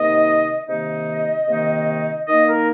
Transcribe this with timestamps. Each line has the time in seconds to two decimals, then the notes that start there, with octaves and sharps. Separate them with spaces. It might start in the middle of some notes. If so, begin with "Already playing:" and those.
Already playing: C3 D#3 A#3 D#4 D#5
0.68 C3 D#3 A#3 D#4 D#5
1.48 C3 D#3 A#3 D#4
2.27 D#3 A#3 D#4 D#5
2.47 A#4